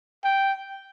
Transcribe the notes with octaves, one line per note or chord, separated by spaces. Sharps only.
G5